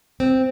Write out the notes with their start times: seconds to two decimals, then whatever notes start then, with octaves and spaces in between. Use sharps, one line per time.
0.20 C4